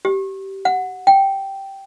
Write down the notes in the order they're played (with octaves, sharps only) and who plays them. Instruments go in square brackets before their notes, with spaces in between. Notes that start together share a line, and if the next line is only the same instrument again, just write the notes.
[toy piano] G4
F#5
G5